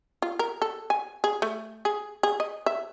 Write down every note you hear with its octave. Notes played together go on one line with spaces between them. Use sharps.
F4
A#4
A4
G#5
G#4
A3
G#4
G#4
D#5
E5